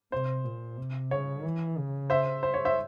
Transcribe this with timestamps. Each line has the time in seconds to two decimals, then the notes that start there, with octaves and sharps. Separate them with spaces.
0.12 C3 C5
0.45 A#2
0.78 C3
1.11 C#3 C#5
1.44 E3
1.78 C#3
2.10 C5 E5
2.43 C5
2.54 C#5
2.65 C5 E5